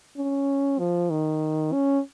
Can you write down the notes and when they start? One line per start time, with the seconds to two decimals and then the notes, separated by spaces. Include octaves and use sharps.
0.17 C#4
0.79 F3
1.10 D#3
1.72 C#4